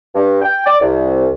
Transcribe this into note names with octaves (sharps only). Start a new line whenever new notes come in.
G2
G5
D5
C2